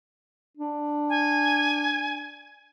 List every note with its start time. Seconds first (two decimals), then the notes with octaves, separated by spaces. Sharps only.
0.57 D4
1.09 G#5